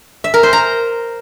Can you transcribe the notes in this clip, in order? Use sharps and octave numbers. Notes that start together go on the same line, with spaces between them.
E5
A#4
C5
A#5